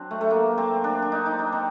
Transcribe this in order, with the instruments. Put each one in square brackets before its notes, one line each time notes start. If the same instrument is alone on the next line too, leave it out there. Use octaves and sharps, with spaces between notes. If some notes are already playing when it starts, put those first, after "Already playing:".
Already playing: [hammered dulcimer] F#3 C4 D4
A3
A3
A#3
C4
D4
D4
D#4
D#4
D4
C4